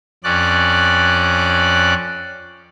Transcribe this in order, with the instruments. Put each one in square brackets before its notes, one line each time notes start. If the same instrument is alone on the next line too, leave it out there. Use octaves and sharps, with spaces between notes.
[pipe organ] F2 C#4 D5 F#6